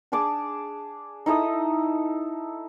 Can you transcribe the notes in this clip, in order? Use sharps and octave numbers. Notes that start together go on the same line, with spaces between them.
D4 G#4 A5 D6
D#4 E4 A4 D#6